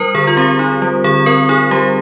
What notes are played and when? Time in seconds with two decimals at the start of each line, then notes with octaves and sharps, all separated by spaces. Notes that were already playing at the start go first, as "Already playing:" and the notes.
Already playing: G3 D#4 A#4 C5
0.15 D3 G#4
0.27 F4
0.37 C4 G4
0.59 D#4
0.82 G3
1.04 D3 G#4
1.26 C4 A#4
1.49 D#4 G#4
1.71 G3 G4